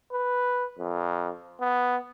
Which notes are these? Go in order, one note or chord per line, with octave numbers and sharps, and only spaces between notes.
B4
F2
B3